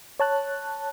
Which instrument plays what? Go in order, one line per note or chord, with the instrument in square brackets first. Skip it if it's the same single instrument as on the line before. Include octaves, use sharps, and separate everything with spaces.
[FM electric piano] C#5 A5 F#6